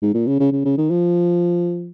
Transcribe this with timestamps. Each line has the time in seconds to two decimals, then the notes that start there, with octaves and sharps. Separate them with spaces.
0.03 G#2
0.14 A#2
0.27 C#3
0.40 C#3
0.52 C#3
0.65 C#3
0.78 D#3
0.90 F3